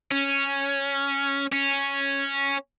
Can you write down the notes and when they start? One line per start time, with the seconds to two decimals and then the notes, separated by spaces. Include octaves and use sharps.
0.11 C#4
1.52 C#4